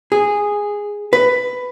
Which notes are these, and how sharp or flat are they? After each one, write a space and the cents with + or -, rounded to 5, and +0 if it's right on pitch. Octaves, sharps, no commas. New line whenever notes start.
G#4 -10
B4 +10